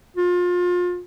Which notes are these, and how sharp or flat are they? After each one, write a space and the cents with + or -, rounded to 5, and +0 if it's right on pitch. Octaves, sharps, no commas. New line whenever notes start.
F4 +30